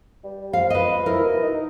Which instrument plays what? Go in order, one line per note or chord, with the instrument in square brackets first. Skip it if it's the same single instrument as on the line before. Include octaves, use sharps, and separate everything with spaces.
[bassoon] G3
[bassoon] F3 [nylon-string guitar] F5
[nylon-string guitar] B4 D#5
[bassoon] E4 [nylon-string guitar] A#4
[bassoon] B2
D#4